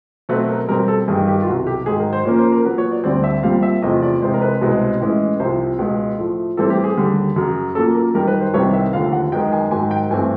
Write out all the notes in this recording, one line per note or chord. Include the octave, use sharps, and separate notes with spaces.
B2 F#3 A3 C4 B4
A#4
B2 G3 C4 A#4
A4
G2 D#3 G3 G#4
G4
F4
C2 B2 F#3 F#4
G4
G#2 D#3 F#3 G#4
A#4
C5
A#2 F3 A#3 C#4 C#5
C5
A#4
A#2 F#3 B3 B4
C#5
D5
D2 D3 G3 C4 D5
E5
A#2 G3 C4 F5
E5
E2 C3 F3 A3 D#5
D5
C3 E3 G#3 C5
A#4
B4
C2 B2 G#3 C4
A2 E3 G#3 C#4
C2 C3 F3 C5
C#2 B2 G#3
A2 F3 A3
A2 E3 G3 C4 A4
G4
G#4
D#2 D3 G3
F#2 C#3 F#3
A#2 F#3 A#3 C#4 A4
A#4
F#2 D#3 G3 A#4
B4
C5
C2 C3 D#3 G3 B3 C#5
E5
D#2 D3 F3 A3 F5
F#5
F#2 D#3 G#3 B3 G5
G#5
G#2 D#3 F#3 G#5
G5
G2 E3 A3 C4 G#5